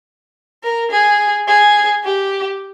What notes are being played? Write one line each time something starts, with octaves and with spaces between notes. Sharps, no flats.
A#4
G#4
G#4
G4